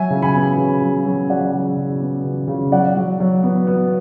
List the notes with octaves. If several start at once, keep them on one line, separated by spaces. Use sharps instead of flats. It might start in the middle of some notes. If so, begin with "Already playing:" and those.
Already playing: F#3 E5 G#5
C#3
G#5 B5
B3
C#3
F#3
F#3
F#3 D5 F#5
C#3
C#3
B3
C#3
C#3
F#3 D5 F#5
F#3
F#3
B3
B3